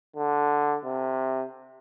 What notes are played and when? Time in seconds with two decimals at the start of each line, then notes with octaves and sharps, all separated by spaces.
0.16 D3
0.85 C3